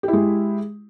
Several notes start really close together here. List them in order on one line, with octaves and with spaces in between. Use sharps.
G4 E4 G#3